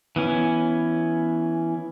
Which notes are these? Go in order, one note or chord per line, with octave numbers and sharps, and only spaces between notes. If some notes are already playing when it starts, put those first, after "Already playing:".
E3 B3 C#4